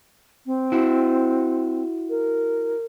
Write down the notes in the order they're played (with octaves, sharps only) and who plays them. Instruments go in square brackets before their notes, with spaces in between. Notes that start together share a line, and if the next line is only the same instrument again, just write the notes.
[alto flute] C4
[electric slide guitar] E4 F#4
[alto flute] A#4